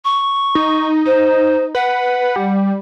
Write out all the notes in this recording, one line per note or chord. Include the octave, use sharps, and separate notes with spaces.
C#6
D#4
D#4 C5
B4 F#5
G3